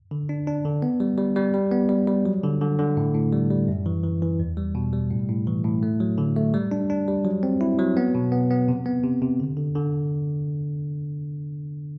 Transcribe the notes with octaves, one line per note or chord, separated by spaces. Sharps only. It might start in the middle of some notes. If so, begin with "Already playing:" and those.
D3
D4
D4
D3
B3
G3
G3
G3
G3
B3
G3
G3
F#3
D3
D3
D3
A2
A2
G3
G3
F#2
E3
E3
E3
E2
G3
B2
G3
A2
A2
E3
A2
A3
F#3
D3
A3
G3
D4
D4
G3
F#3
C4
E4
F#3
B3
B2
B3
B3
C3
B3
C3
C3
D3
D3
D3